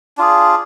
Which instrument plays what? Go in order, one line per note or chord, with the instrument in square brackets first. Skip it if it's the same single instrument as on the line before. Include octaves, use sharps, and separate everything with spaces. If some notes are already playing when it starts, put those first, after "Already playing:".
[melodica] D4 F4 G#4